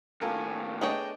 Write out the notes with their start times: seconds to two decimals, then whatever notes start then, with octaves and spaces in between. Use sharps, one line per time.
0.21 D#2 A2 F4 A4 A#4 G#5
0.81 A3 B3 D4 G#4 C#5 D#5 G5